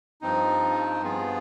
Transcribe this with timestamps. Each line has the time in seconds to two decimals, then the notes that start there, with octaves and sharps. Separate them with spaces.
0.21 G2 F3 C4 D#4
1.02 G2 F3 B3 F4 G#4